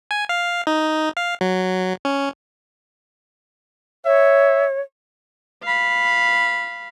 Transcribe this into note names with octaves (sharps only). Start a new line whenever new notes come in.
G#5
F5
D#4
F5
F#3
C#4
C#5 E5
F5 B5